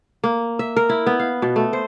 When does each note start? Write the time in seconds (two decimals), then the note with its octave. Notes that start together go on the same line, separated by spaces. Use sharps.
0.24 A#3
0.59 E5
0.76 A#4
0.89 E4
1.06 B3
1.19 F5
1.42 B2
1.56 A3
1.73 C5